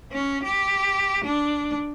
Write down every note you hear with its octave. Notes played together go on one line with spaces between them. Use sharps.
C#4
G4
D4